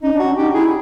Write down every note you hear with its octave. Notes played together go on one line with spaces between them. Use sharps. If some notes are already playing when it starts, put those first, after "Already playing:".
C#4 D#4
D4
C#4 F#4
D#4 G4
E4 G#4